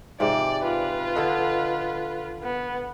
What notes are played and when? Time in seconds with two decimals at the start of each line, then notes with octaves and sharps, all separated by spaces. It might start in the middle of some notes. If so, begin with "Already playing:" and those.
0.20 G#2 C3 F3 D5
0.63 F4 B4
1.15 D3 A4 D#5
2.43 B3